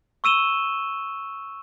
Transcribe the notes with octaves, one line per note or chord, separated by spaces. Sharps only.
C#6 E6 D#7 E7 G7